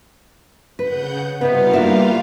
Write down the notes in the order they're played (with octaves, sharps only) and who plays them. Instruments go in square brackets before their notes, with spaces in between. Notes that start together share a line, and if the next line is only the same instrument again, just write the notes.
[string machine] C#3 F#5 G6 [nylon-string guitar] B4
[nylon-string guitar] C3 D#4 B4 [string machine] G3 F4 F5 [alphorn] B3
[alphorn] A#3 [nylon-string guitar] D4 E4 F#4